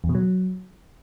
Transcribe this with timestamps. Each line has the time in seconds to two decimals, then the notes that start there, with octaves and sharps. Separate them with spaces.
0.04 E2
0.09 B2
0.15 F#3